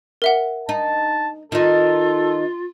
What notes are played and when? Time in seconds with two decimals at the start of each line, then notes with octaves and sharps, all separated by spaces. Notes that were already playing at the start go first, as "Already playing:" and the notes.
0.22 A#4 E5 F#5
0.69 D#4 A5
1.52 D#3 D#4 F4 A4